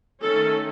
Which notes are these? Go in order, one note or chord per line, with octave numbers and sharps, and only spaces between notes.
D#3 A3 C#4 A4